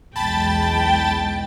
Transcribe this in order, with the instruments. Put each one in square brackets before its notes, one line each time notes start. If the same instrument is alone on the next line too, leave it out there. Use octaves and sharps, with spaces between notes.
[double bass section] B1 E2 G#3 [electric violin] G5 [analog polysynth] A5 B5 A6